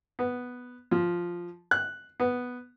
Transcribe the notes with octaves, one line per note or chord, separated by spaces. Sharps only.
B3
F3
F#6
B3